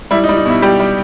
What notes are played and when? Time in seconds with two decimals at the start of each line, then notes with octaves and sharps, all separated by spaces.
0.11 G3 E4
0.24 D#4
0.29 G3
0.37 D#4
0.46 B2 E4
0.62 G3 G4
0.80 G3